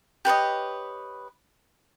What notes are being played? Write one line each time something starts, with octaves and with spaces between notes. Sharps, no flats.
G4 B4 C#5 D#5